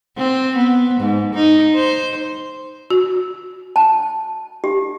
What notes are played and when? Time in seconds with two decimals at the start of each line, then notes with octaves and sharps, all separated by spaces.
0.17 C4
0.56 B3
1.00 G#2
1.34 D#4
1.75 C5
2.90 F#4
3.76 A5
4.64 G4